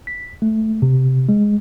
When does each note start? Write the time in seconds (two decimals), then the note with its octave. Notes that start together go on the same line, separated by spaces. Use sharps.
0.07 B6
0.42 A3
0.82 C3
1.29 G#3